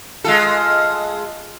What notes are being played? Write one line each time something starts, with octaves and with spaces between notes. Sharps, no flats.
G#3 F4 A4